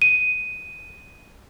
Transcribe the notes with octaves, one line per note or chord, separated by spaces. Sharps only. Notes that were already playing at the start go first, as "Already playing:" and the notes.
D#7